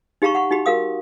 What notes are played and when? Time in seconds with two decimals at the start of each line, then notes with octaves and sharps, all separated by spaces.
0.22 D#4 G4 F5 A#5 B5 C#6
0.35 F#5 B5 C#6
0.51 D#4 F#4 G4 B5
0.66 F#4 A#4 F5 D#6